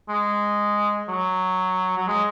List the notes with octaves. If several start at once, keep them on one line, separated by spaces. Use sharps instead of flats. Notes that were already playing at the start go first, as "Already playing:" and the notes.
G#3
F#3
F#3
G#3